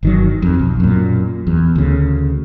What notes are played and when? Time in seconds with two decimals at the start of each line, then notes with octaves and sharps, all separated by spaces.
0.03 G1 D#3 F#3
0.42 F2
0.59 B1
0.80 F#2 A#2
1.47 E2
1.76 D2 C#3